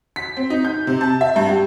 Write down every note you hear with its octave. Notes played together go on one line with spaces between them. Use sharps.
B6
C4
D#4
G6
C3
A5
E5
G2
G4